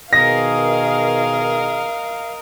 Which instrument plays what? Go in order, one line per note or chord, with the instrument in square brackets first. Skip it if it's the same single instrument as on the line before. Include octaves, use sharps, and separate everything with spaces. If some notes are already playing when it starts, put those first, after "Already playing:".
[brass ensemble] B2 D#3 G#4 [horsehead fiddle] A#4 D#5 [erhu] F5 [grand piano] A#6